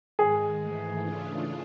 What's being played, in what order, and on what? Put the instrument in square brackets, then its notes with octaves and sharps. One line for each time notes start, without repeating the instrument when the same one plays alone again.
[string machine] G#2 D#3 G#3 [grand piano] G#4
[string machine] G#2 E3 A3
C#3 E3 A3 D4 F4